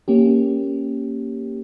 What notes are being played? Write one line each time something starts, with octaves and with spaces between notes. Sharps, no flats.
A#3 C#4 G4